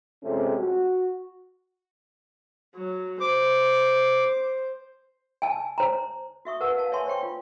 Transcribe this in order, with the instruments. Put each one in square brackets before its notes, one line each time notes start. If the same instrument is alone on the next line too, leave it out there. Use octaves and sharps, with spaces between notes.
[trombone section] F2 C3 G#3 A3 C#4
F#4
[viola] F#3
[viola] C5 [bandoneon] D6
[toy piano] G#5 A5
C5 A#5
F#4 E5 C#6 D#6
A#4 B4 F#5 A5 C#6 E6
F5 A5
C#5 E5 G#5 A5 C6 C#6
C5 C#5 G5 C#6
F4